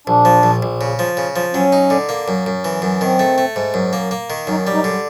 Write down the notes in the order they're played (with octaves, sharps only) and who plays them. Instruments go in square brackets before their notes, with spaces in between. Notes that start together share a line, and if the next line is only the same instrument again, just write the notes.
[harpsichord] A#1 [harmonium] D4
[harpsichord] F3
A#1
A#1
C#3
F3
C#3
F3
[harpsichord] F#3 [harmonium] C#4
[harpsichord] D#4
D3
A#3
F#2
F#2
E3
F#2
[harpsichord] D#3 [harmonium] C4
[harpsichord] A3
A3
G#2
F#2
A#3
A#3
D#3
[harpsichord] F#2 [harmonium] D#4
[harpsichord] G3
[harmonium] D#4
[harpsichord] D3